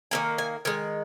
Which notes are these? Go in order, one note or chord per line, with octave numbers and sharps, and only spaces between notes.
D#3 G3 A#3 G#5
G#5
D#3 G#3 G#5